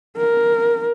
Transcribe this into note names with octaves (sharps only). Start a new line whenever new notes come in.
A#4